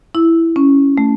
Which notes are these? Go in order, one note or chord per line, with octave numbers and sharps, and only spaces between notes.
E4
C#4
A3